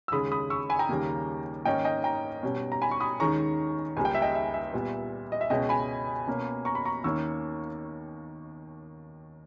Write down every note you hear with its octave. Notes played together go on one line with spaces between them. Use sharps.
E6
D#2 C#3 G#3 B5 D#6
B5 D#6
C#6 E6
G#5 B5
G5 A#5
D#2 C#3 G3 A#3
G#2 D#3 A#3 C#4 D#5 G5
D#5 G5
G5 A#5
B2 G3 C#4
A#5
G#5 B5
C#6
B5 D#6
D#2 D#3 G#3 C#4 A#5 C#6
C#2 C#3 G3 A#3 G#5
G5
E5
D#5 G5
E5
E5
A#2 G3 B3
D#5
E5
C#2 B2 G#3 C#4 D#5 G5
G#5 B5
B2 A#3 C#4
A#5 C#6
B5
A#5 C#6
D#2 D#3 A#3 C#4 C#6 E6